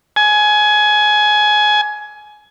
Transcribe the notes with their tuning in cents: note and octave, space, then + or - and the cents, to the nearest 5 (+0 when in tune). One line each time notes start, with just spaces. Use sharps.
G#5 +20